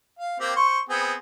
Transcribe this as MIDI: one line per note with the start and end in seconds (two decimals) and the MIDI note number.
0.19 0.39 77
0.40 0.55 58
0.40 0.55 60
0.40 0.55 67
0.56 0.79 72
0.56 0.79 85
0.89 1.14 59
0.89 1.14 60
0.89 1.14 68